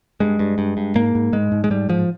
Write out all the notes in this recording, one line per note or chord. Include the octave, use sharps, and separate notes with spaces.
G2 G#3
G2
G2
G2
G#2 A#3
G#2
G#2 G#3
G#2
G#3
G#2 G3
G#2 F3